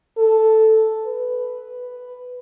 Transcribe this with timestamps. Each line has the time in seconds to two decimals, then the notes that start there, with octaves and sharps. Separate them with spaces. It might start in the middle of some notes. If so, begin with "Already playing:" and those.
0.17 A4
1.05 B4